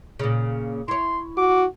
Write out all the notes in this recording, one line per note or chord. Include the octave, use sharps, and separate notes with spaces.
A#2 C#3
E4 C#5 C6
F#4 D6